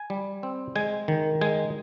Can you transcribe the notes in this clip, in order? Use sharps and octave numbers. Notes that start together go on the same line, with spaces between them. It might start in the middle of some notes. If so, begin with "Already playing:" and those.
Already playing: G#5
G3
C4
G#3 G#5
D#3
G#3 G#5